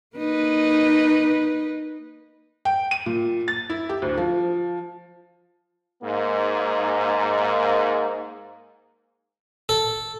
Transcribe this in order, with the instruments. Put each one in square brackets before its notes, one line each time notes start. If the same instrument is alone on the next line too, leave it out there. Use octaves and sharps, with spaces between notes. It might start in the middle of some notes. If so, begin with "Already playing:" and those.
[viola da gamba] A#3 D#4 B4
[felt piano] G5
D#7
A#2
A6
E4
G4
D2
F3
[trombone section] G#2 A#3
[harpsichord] A4